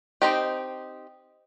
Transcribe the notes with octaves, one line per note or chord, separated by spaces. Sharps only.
C4 D#4 G4